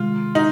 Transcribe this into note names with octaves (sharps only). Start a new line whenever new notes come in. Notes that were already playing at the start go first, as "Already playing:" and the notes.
Already playing: C3 D#3 G#3 F4
D#4